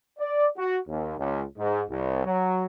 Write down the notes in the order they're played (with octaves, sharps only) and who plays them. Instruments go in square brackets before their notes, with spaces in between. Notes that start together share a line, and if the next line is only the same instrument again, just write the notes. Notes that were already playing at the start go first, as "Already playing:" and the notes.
[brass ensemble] D5
F#4
D#2
C#2
G#2
C2
F#3